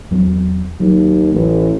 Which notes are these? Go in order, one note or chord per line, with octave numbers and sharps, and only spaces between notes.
E2 F#3 C4
D#2 F#3
A1